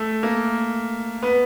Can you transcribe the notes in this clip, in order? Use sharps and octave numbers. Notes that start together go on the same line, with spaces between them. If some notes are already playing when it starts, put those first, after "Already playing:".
Already playing: A3
A#3
B3